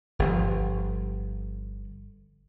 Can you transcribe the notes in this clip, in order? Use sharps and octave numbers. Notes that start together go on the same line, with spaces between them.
G1 F3